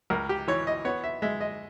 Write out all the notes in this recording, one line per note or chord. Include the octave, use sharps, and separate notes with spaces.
C#2 A#4
G4
E3 C#5
D#5
B3 C#5
E5
G#3 E5
D#5